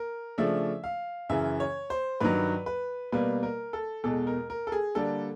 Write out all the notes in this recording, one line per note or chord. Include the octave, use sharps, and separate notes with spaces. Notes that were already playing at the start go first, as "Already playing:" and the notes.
Already playing: A#4
C#3 F3 A3 D4 E5
F5
F#2 C#3 E3 E5
C#5
C5
G2 D#3 F#3 B4
B4
B2 G3 A#3 B4
A#4
A4
E2 B2 G#3 A4
A#4
A#4
A4
G#4
D3 G3 A#3 D4 A4